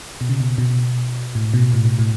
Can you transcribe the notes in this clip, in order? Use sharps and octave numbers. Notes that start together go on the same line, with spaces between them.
B2
C#3
B2
B2
A2
B2
A2
B2
A2